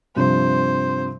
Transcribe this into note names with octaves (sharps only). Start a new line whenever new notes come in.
G2 C3 F3 C5